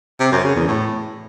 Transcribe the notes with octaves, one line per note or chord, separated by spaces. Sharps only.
C3
F#2
C#3
E2
A2